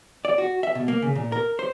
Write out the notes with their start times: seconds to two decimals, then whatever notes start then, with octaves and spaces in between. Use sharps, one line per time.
0.25 D5
0.38 F#4
0.63 E5
0.75 B2
0.88 A#3
1.02 C#3
1.15 A#2
1.32 A#4
1.59 C5